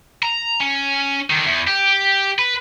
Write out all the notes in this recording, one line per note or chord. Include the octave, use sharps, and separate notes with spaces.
A#5
C#4
D3 D#3
E2
G4
B4